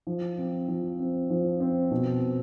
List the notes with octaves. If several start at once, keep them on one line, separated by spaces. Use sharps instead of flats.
F3
C4
F3
C4
F3
C4
B2